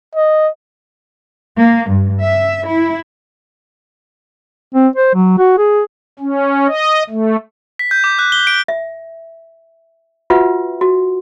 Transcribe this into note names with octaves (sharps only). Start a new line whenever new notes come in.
D#5
A#3
G2
E5
E4
C4
C5
F#3
F#4
G#4
C#4
D#5
A3
B6
G6
D6
F#6
G7
D7
E5
F4 F#4 B4 E5 F#5
F#4